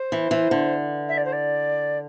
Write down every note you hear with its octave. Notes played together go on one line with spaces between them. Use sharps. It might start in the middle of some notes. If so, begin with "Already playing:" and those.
Already playing: C5
E3
E3
D3
E5
D5
C5
D5